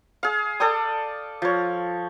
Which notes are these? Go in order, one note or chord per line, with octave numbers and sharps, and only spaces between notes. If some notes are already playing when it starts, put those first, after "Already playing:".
G#4 F5
A4 D5 G5 D#6
F3 C#5